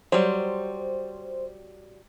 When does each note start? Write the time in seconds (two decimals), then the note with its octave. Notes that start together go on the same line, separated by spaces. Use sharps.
0.12 F#3 G3 C5